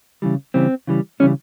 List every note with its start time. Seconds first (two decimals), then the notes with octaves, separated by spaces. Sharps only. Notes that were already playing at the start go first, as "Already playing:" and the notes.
0.22 C#3 E3 G3
0.54 C#3 E3 G3 C4
0.87 C#3 E3 G3
1.20 C#3 E3 G3 C#4